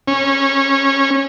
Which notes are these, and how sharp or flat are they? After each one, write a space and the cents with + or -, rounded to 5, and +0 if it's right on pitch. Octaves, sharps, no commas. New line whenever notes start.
C#4 -20